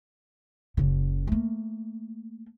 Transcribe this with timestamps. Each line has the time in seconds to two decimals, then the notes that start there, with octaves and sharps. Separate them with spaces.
0.77 F#1 C#3
1.27 A3 A#3